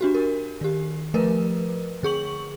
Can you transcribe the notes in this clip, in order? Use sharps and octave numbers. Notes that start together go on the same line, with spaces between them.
D4 F#4 G4
A#4
D#3 G4
F3 A3 A#4 B4
D3 G#4 C#6 F#7